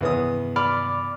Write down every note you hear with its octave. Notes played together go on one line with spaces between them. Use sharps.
E2 G2 C3 D#3 B3 D#6
D5 B5 D6 F6